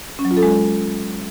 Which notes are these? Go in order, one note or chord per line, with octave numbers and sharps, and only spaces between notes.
C#4
F#3
F4
A4
G#3